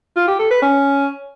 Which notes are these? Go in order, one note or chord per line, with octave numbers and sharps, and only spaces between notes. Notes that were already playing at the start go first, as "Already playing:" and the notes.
F4
G4
A4
B4
C#4